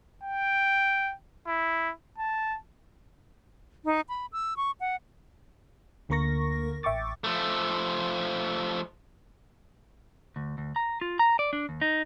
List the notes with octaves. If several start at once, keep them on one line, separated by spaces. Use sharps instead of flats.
G5
E4
A5
D#4
B5
E6
C#6
F#5
D2 D3 A#3 A#4 C#6 A#6
A1 E5 G5 C#6 D6 A6
F3 A3
D2
D2
A#5
F4
A#5
D5
D4
D#2
D#4